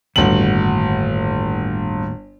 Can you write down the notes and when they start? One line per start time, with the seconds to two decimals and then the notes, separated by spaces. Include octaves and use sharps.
0.16 G1 D#2 A2 F#4 F#7